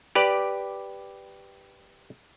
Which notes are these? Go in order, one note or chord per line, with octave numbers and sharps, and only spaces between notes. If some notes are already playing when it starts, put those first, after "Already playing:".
G4 B4 D5